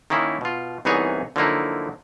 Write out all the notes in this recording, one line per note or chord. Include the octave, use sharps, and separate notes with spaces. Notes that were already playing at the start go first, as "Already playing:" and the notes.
D#3 A#3 C#4 E4
B2 F4
C2 E3 B3 D#4 G#4 C#5
D3 F3 F#3 A#3 D#4 E4